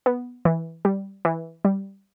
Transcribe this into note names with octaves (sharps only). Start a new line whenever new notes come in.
B3
E3
G3
E3
G3